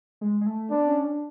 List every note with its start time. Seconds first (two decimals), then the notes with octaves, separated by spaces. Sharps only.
0.21 G#3
0.41 G#3
0.46 A3
0.71 B3 D4
0.88 C#4
1.04 D4